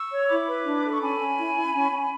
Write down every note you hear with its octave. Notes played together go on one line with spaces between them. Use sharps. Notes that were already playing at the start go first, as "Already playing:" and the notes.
Already playing: C#6 E6
C#5
E4 B5 D6
B4
D4
A4
C#6
C#4 G#5 B5
C#4
E4
E4
C#4
C#4